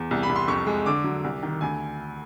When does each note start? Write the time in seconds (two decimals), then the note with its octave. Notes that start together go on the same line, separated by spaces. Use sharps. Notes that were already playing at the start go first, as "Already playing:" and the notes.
Already playing: E2
0.11 C2
0.23 B5
0.29 C2
0.36 C6
0.48 F2 C#6
0.67 G#3
0.86 D3 D6
1.04 F#3
1.24 C2
1.43 D#3
1.61 D2 G#5